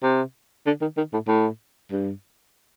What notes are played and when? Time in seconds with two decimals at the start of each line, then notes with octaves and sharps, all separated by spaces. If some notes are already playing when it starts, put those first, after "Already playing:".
0.03 C3
0.66 D3
0.81 D#3
0.97 D#3
1.13 A2
1.28 A2
1.92 G2